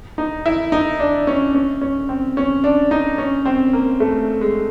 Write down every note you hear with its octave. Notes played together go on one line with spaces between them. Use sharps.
D#4
E4
D#4
D4
C#4
C#4
C#4
C4
C#4
D4
D#4
C#4
C4
A#3
A3
G#3